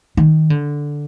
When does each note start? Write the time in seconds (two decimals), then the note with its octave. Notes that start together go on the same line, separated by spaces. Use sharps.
0.17 D#3
0.50 D3